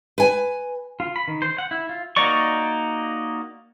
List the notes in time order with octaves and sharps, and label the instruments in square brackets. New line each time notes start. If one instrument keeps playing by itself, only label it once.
[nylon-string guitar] B4 G#5
[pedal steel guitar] F4
B5
D#3
C5
F#5
E4
F4
A#3 D#4 F#4 D5 C#6